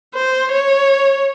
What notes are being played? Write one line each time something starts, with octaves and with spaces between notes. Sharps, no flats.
C5
C#5